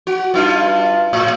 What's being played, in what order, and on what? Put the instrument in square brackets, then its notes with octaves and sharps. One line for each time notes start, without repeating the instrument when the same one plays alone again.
[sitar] F#4
G2 D#4 F4
A2